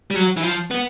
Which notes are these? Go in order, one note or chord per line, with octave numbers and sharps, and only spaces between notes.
G3
F#3
E3
F3
B3